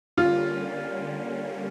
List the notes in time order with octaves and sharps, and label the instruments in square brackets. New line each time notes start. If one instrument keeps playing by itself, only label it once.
[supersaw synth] D3 G3 A#3 C#4 [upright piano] F4